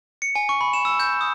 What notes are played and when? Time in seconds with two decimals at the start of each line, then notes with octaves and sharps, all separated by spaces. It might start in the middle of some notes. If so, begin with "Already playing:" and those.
0.22 C#7
0.35 G#5
0.49 C#6
0.61 B5
0.73 E7
0.85 E6
1.00 G6
1.21 D#6